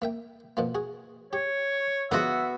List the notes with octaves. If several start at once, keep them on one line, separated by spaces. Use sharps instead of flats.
A#3 E5 G5
B2 F3 A#3
F#4 G#4
G4 C#5
D3 F3 G#3 B3 F#4 E5